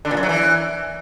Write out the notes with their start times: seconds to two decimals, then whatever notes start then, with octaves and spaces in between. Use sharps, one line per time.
0.05 D3
0.11 A#2
0.17 F#2
0.23 F#3
0.29 E3